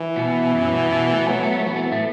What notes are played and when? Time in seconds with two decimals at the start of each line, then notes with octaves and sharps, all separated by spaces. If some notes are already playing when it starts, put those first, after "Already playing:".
Already playing: E3
0.16 B2 B3
0.54 F#2 F#3
0.72 B2 B3
0.92 B2 B3
1.11 A3
1.18 B3
1.26 A3
1.29 F#3
1.35 B3
1.43 A3
1.51 B3
1.59 A3
1.67 E3 B3
1.76 A3
1.83 B3
1.92 A2 A3